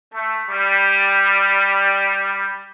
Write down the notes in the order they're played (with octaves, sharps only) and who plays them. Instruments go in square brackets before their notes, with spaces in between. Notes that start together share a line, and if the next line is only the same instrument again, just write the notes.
[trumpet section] A3
G3